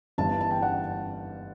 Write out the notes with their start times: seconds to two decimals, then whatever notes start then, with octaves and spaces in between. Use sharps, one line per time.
0.18 G1 G2 E3 A5
0.29 A5
0.41 A5
0.51 G5
0.62 F#5